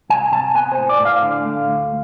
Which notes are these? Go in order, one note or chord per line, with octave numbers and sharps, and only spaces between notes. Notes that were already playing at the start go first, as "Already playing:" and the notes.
C2 G#5
C3 A5
B3 G#5
C5
A2
D5
A2
F5
D3
A3
D2